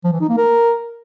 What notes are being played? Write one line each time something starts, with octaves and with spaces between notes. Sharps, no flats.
F3
E3
D#4
A#3
A#4